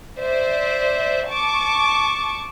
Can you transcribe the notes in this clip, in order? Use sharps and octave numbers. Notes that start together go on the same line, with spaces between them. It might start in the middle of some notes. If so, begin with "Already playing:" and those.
C5 D5 E5
A5 C#6 D6